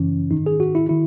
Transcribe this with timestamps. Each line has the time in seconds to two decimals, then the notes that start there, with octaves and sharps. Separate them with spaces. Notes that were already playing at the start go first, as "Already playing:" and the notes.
Already playing: F#2 C#3 E3 C#4
0.31 G#2 D#3 D#4
0.46 G#4
0.60 F#4
0.75 E4
0.89 D#3 E4